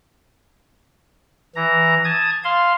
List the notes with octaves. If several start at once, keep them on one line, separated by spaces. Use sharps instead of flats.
E3 A#5
A5 D#6 G#6
F5 C6